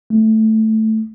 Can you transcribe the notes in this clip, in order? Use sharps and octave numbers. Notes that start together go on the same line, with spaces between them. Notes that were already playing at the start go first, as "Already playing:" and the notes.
A3